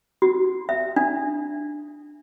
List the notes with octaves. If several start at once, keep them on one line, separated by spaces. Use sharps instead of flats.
F#4
E5
D4